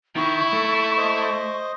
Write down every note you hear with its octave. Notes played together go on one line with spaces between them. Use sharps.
D#3 E4 C#6
A3
C5 D#5